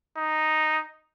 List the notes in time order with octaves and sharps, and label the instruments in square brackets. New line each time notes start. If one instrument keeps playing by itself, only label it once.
[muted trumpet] D#4